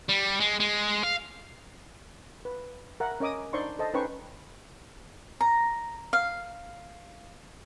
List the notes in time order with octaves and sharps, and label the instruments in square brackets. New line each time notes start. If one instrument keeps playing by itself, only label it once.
[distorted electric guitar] G3
G#3
G#3
F5
[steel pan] B4
A#4 E5 F#5
C#4 A#4 D#5 D6 D#6
D4 D#4 C5 D5 C6 C#6
A4 C5 D#5 A5
C#4 D#4 B4 C5 G5 C#6
[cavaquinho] A#5
F5